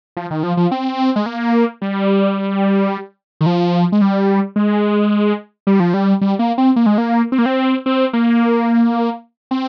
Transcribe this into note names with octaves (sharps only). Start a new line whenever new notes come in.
F3
D#3
F3
F3
C4
G#3
A#3
G3
D#3
F3
G#3
G3
G#3
G3
F3
G3
G3
A#3
C4
A#3
G#3
A#3
C4
A#3
C4
C4
A#3
C4